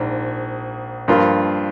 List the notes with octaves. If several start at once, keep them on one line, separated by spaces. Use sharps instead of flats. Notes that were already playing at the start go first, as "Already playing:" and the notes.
Already playing: A#1 G#2
G2 F3 A#3 F4